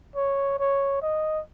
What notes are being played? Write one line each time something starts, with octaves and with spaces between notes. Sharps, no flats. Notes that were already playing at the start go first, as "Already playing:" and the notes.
C#5
C#5
D#5